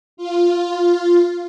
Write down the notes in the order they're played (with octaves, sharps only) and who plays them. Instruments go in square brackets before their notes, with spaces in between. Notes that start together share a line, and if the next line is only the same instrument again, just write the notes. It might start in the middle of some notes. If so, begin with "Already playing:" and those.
[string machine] F4